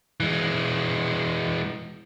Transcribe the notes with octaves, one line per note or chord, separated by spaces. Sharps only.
E3 G#3